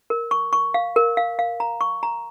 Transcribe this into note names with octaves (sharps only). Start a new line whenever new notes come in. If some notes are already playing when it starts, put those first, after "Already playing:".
A#4
C#6
C#6
F5
A#4
F5
F5
A#5
C#6
A#5